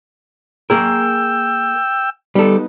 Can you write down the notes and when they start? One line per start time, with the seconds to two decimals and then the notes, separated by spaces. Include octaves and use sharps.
0.70 A#3 G#4 A#4 G5 E6
2.35 G3 B3 D#4 A4